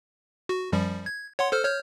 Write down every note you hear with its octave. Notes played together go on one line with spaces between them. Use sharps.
F#4
F#2 F3 G3
G#6
C#5 F#5 C6
A4 C5 F6
C#5 F6 G6